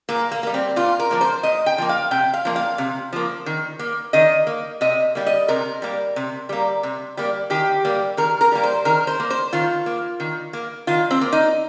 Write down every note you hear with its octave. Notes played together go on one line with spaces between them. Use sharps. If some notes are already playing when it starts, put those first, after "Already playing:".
A#2 A#3
A#3
G3 A#3
C4
A#2 F4
A#4
F3 A#3
C5
A#2 D#5
G5
F3 A#3
F5
C3 G5
F5
F3 A#3
F5
C3
F3 A#3
D#3
A#3
D#3 D#5
A#3
C3 D#5
G3 A#3
D#5
C3 A#4
G3 A#3
C3
G3 A#3
C3
G3 A#3
D#3 G4
G3 A#3
D#3 A#4
A#4
G3 A#3
C5
D#3 A#4
C5
A#3
C5
D#3 F4
A#3
D#3
A#3
D#3 F4
C4
A#3
D#4